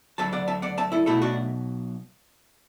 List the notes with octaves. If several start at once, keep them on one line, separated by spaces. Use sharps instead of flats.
D2 D3 F#3 E5 A5
D5 F#5
E5 A5
D5 F#5
E5 A5
E4 A4
B1 B2 F#3 A3 E4 A4
D4 F#4